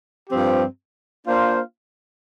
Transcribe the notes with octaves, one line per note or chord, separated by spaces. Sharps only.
G2 F3 C4 G4
A#3 D4 F4 C5 F5